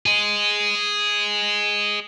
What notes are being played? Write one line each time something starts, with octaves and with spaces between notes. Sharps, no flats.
G#4 D#5